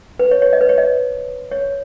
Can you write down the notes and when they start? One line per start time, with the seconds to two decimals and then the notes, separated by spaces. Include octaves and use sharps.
0.19 B4
0.31 C#5
0.42 C#5
0.53 D#5
0.61 B4
0.69 C#5
0.78 D#5
1.51 C#5